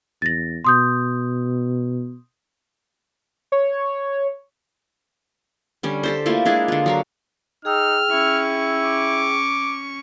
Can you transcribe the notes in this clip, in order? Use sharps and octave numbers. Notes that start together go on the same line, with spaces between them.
E2 A6 A#6
B2 C6 D#6 G6
C#5
D3 G3 C#4
G4 A4 C5
A3 A#3 E4 F4
G#3 D4 E4 G#4
D3 F4
F#3 A#4 F5
D#4 G#4 G5 E6 F6
C#4 E4 C#6
D6